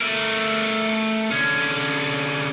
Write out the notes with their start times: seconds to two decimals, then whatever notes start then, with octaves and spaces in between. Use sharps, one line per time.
0.01 A3 A#4
1.31 D3 C#4